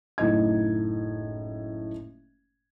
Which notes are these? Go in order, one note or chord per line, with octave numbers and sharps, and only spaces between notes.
F#1 A2 D#4 D#5 G#6